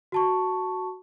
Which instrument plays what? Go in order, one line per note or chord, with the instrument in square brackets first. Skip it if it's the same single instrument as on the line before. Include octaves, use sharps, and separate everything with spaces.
[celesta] F#4 A5 C#6